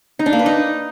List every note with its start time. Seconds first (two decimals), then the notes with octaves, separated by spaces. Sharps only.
0.19 D#4
0.26 D4
0.33 A#3
0.39 B4
0.46 D#4